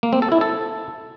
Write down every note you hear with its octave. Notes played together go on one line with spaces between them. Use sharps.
A#3
C4
A4
E4
A4